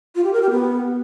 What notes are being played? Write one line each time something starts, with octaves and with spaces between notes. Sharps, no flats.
F4
G4
A#4
G4
B3